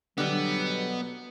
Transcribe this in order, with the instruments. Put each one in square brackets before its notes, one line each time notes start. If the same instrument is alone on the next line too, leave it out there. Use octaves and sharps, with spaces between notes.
[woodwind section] B2 F#3 [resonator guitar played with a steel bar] D3 G3 [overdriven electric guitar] B3